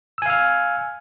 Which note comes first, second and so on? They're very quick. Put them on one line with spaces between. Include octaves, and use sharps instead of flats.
E6 G#5 F5 F6